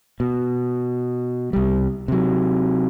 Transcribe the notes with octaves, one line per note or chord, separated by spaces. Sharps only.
B2
C2 G3
C3 F#3